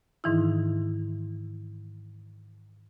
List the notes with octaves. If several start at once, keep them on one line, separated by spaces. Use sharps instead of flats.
G#2 D#3 E3 D#4 E4